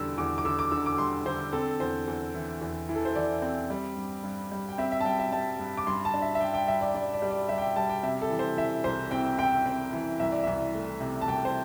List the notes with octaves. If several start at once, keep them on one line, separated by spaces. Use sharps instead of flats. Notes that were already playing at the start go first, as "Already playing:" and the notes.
Already playing: E2 D3 G3 E6
E2 D6
D6
D3 E6
D6
D3 E6
D6
G3 C6
D3 C5
C4 A4
E2 C5
E2
E3
E2
E3
A4
C5
E3 D5
C4
G3
G2
G2
G3
G5
C4 E5
E5
A5
G3 G5
E5
G3 A5
G2
D6
G2 C6
A5
D4
E5
E5
G2 G5
G5
G2 E5
D5
G2 D5
D5
G3
D5
G3 E5
G5
E5
G3 A5
G5
C3 E5
A4
E3
C5
E3 E5
C2 C5
C4 G5
C4 G5
C4
E3
C2 E5
D5
C2 E5
A3
C3
A5
C2 G5
C5